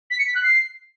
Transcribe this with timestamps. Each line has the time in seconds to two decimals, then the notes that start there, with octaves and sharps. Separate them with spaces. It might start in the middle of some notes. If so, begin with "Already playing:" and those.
0.10 B6
0.18 C#7
0.27 B6
0.35 F#6
0.43 C7